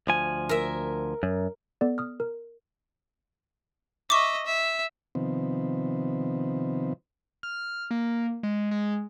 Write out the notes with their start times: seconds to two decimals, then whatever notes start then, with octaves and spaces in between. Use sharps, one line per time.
0.07 D2 F3 G#5
0.49 A#4 E5
1.23 F#2
1.81 B3 A4 D5
1.98 D#6 F6
2.20 A#4
4.10 D#5 E5 C#6 D6
4.46 E5
5.15 C3 D#3 F3 B3 C4
7.43 F6
7.91 A#3
8.43 G#3
8.71 G#3